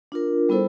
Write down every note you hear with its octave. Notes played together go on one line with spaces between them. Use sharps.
D4 F4 A#4
G3 B3 E4 A4 C5